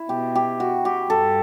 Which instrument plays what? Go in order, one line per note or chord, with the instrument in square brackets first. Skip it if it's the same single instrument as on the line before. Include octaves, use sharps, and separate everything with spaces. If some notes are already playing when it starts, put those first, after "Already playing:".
Already playing: [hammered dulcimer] E4
[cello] B2 [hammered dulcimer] G4
[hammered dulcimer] G4
F#4
G4
[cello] G2 [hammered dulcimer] A4